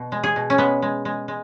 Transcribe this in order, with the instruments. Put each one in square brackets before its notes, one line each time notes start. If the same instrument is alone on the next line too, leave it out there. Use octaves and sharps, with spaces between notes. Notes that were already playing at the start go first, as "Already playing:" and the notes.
Already playing: [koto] B2
G#3
G#4
B2
C#4
G#3 B3
G#3
G#3
G#3